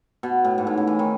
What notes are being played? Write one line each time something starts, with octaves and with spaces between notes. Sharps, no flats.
B2
A2
G#2
A2
C#3
E3
D#3